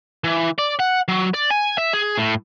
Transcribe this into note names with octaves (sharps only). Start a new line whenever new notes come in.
E3
D5
F#5
F#3
D5
G#5
E5
G#4
A2